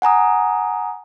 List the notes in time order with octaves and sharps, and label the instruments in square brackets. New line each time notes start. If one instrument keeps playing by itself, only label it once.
[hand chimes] F#5 G#5 A#5 D#6